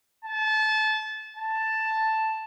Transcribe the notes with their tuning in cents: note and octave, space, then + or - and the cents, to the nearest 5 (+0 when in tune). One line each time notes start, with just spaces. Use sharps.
A5 -25
A5 +5